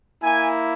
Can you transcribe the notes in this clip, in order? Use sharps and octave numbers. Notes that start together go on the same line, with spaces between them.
A#3 E4 G#5